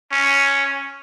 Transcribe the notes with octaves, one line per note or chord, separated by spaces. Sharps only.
C#4